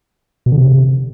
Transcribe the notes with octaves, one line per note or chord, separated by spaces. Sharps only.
B2
D3
C3